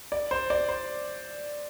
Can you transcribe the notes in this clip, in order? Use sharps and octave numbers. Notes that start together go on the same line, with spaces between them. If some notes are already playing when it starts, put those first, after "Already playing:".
D5
C5
D5
C5